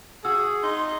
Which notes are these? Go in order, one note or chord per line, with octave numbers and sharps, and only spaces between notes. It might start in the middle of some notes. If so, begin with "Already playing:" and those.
F#4 G#4 E6
D#4 C6